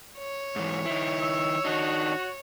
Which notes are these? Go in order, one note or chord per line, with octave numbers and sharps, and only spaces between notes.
C#5
G#2 E3
D#3 E4
E6
D#3 D4 D#4 F#4